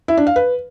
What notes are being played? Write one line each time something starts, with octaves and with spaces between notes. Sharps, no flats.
E4
D4
F5
B4